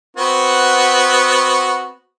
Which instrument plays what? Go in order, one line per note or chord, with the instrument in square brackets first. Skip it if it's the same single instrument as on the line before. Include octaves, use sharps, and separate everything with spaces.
[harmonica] B3 C4 F#4